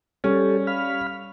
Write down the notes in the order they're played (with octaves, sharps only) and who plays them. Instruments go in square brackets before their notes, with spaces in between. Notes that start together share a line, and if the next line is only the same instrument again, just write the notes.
[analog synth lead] G3 [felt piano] C#4 [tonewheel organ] G4 A4
[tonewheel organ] F5 B5 F6